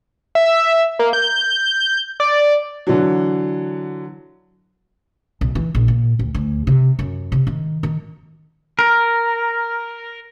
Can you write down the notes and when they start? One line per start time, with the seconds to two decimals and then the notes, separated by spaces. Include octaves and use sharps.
0.35 E5
0.99 A#3
1.13 G6
2.20 D5
2.87 D3 E3 F#3
5.41 B1
5.55 E3
5.75 A#1
5.88 A#2
6.19 D2
6.35 D2
6.67 C3
6.99 F#2
7.32 C3
7.47 D#3
7.83 D#3
8.79 A#4